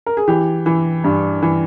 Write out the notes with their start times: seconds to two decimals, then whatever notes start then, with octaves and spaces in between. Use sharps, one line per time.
0.06 A#4
0.17 G#4
0.28 E3 G4
0.66 E3
1.04 G2
1.43 E3